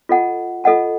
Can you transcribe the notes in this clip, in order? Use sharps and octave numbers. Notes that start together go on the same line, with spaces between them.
F4 A4 D#5 F#5 A5
F4 A4 D#5 F#5 A5